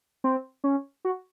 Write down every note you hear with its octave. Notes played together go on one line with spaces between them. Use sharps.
C4
C#4
F#4